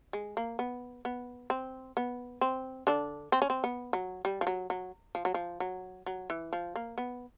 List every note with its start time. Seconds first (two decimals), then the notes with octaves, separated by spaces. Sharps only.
0.13 G#3
0.37 A#3
0.59 B3
1.05 B3
1.50 C4
1.97 B3
2.41 C4
2.87 D3 D4
3.32 C4
3.42 C#4
3.50 C4
3.64 B3
3.93 F#3
4.25 G3
4.41 F3
4.47 F#3
4.70 F#3
5.15 F3
5.25 F#3
5.34 F3
5.60 F#3
6.06 F#3
6.30 E3
6.53 F3
6.76 A#3
6.98 B3